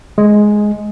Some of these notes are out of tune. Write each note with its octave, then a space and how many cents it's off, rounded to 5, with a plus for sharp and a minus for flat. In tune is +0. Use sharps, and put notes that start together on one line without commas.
G#3 +10